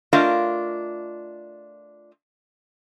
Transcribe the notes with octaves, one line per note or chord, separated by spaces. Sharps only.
A3 D4 F4 A#4 D#5 F5